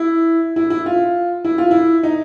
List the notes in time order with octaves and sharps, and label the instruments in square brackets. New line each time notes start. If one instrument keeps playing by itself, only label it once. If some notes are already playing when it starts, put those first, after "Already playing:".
Already playing: [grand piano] E4
E4
E4
F4
E4
F4
E4
D#4